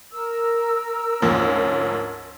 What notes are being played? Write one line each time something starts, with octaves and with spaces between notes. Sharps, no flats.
A#4 E6
D2 G#2 F3 C#4